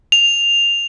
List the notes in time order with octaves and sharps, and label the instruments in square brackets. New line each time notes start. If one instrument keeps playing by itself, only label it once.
[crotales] F7